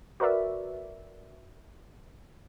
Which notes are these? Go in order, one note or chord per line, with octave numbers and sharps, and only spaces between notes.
F#4 A#4 B4 D5 E5